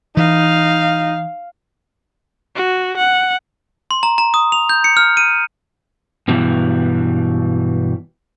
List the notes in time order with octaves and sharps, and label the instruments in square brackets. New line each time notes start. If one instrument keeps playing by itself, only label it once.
[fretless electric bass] E3 [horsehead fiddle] D#4 [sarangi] F5
[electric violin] F#4
F#5
[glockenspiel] C6
A#5
A#5
D#6
F7
G6
C#7
F6
D#7
[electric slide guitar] G2 B2 E3 G3